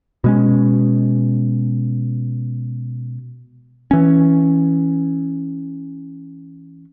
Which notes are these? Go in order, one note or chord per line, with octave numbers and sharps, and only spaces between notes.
B2 G#3 C#4
E3 C#4